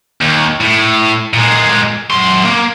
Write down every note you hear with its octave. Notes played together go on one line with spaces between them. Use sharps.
D#2
A2
A#2 G#3
F#2 C6
A#3